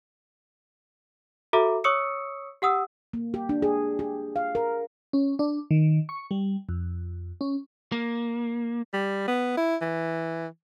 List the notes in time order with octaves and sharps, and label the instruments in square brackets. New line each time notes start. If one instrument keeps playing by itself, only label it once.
[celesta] F#4 A4 E5 A#5 D6
C#5 C#6 D#6 E6 C#7
G4 F#5 D#6 E6
[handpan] A#3
G4
D4
G#4
G4
F5
A#4
[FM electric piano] C#4
D4
D#3
C#6
G3
F2
C#4
[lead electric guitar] A#3
[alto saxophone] G3
B3
E4
E3